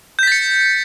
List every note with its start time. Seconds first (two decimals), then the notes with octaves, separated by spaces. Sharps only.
0.19 G6
0.23 B6
0.27 A6
0.32 C#7